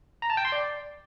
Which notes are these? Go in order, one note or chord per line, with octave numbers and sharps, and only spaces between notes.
A#5
A5
G5
C6
D5